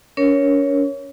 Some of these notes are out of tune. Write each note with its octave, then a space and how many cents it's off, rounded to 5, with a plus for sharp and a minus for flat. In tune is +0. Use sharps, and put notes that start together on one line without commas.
C#4 +40 A#4 +15 C#5 +0